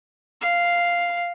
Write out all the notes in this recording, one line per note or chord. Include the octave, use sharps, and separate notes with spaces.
F5